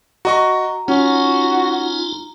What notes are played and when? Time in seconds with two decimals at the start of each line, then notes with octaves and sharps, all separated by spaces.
0.25 F#4 D#5 A#5 C#6
0.88 C#4 D#4 F4 F#4